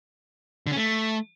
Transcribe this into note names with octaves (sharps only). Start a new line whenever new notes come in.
D3
C#4
A3